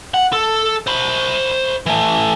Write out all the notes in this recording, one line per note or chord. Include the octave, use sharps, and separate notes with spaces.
F#5
A4
C5 B5
E3 A3